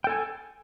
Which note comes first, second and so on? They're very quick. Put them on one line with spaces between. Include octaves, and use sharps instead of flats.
G5 A4 G#5